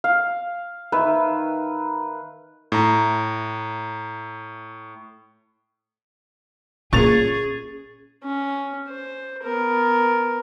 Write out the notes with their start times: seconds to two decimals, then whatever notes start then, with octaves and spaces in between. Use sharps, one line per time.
0.04 F5
0.92 D#3 B4 E5
2.72 A2 A#5
6.93 A#2 C#4 G#4 C#6 A6 F7
8.23 C#4
8.88 C5
9.43 B3 A#4